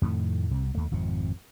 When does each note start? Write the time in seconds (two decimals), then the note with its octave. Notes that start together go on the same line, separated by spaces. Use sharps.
0.02 F2 A2 D#3 A3
0.51 C2 C3
0.75 D#2 A3
0.92 G#1 F2 C3